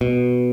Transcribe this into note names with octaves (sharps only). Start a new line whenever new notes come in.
B2